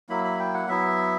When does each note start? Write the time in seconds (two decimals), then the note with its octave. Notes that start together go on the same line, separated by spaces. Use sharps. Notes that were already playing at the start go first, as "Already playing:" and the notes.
0.09 F#3 A#3 E4 B5
0.25 B5
0.39 G5
0.54 F#5
0.68 F#3 B3 E4 E5